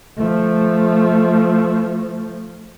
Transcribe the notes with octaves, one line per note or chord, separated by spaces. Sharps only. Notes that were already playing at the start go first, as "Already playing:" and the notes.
F3 A3